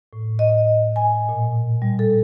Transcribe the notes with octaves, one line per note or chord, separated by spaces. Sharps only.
A2
D#5
G#5
A#2
G3
A4